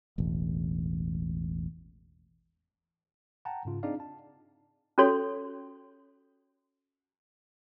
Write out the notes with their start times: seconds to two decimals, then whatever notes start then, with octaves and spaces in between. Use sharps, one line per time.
0.18 E1 A1
3.45 F#5 G5 A5 A#5
3.65 G#2 C#3 F4
3.83 C4 D4 D#4 G#4 D5 F5
4.00 A5
4.98 C#4 F#4 A4 C#5 C6